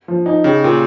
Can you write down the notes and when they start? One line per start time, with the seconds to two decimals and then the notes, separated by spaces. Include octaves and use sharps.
0.08 F3
0.26 D#4
0.44 C#3 G4
0.62 A#2 G4